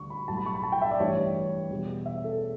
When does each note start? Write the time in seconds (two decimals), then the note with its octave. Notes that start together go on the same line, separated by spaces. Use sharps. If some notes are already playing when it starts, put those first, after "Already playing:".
Already playing: D2 D3 G3 C#6
0.10 B5
0.28 B1 A2 G3 A5
0.37 B5
0.46 C#6
0.55 B5
0.63 A5
0.72 G5
0.82 E5
0.91 D5
0.99 A1 G2 E3 G3 C#5
1.70 E2 B2 G3
2.06 E5
2.24 A4